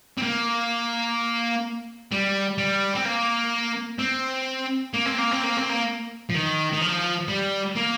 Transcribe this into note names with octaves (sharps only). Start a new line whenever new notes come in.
C4
A#3
G3
G3
C4
A#3
C4
A#3
C4
A#3
C4
A#3
C4
A#3
F3
D#3
D#3
F3
G3
A#3